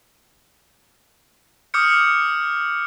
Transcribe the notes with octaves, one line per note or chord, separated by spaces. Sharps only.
D6 D#6 F6 G6 C#7